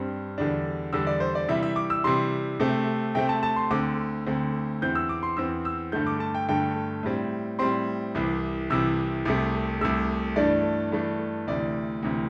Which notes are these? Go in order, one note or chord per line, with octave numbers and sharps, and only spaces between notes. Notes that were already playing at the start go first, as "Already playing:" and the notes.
Already playing: G2 G3 C4
E2 D3 G3 D4
E2 D3 G3 D4 E6
D5
C5
D5
C3 E3 G3 E5
E5
D6
E6
C3 E3 G3 C6
C3 A3 C4
C3 A3 C4 G5
A5
A5
C6
D2 D3 C4 D6
D2 D3 C4
E2 E3 C4 G6
E6
D6
C6
E2 E3 C4 E6
E6
G2 D3 A3 G6
D6
A5
G5
G2 D3 A3 G5
A2 G3 C4
A2 G3 C4 C6
C2 C3 E3
C2 C3 E3 E6
C2 C3 A3
C2 C3 A3 E6
G2 E3 A3 D4 D5
G2 E3 A3 D4
D2 C3 E3 D5
D2 C3 E3